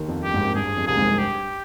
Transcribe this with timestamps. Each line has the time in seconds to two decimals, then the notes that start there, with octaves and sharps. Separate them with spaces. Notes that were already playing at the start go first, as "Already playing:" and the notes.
Already playing: D#2 D#3
0.08 F2
0.23 G2 G4
0.34 G#1 G#2
0.45 G#1 G#2
0.55 G2 G#4
0.65 G2
0.77 F2
0.87 C2 C3 G#4
0.97 G#1 G#2
1.09 G2
1.19 G4